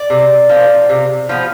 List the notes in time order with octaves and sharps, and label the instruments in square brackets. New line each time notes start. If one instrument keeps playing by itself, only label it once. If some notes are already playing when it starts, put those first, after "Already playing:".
Already playing: [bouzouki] D5
C3
F3 C4
C3
F3 B3